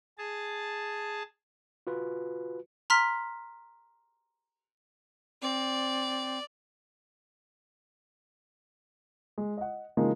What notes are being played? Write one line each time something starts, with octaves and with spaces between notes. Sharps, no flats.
G#4 A5
F4 F#4 B4
A#5 C6 F6 B6
C4 D5
G#3
D#5 F#5
C#3 E3 F3 G#3 A#3 D#4